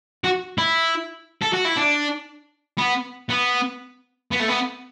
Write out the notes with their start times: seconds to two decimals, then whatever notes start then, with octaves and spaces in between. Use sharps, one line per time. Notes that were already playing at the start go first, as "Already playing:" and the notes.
0.24 F#4
0.58 E4
1.42 A4
1.53 F#4
1.65 E4
1.77 D4
2.78 B3
3.29 B3
4.31 B3
4.40 A3
4.48 B3